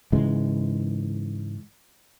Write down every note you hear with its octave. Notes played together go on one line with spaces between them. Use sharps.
G#2 C#3 E3 G#3